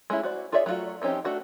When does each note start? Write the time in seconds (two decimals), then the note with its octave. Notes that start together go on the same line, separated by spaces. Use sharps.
0.10 G#3 A3 C#4 E4
0.23 F#4 C5 D5
0.52 F4 G#4 C#5 D5 E5
0.66 F#3 A3 B3 F4 F#4
1.02 F3 C4 C#4 D#4 G4
1.25 A3 D4 F#4 F#5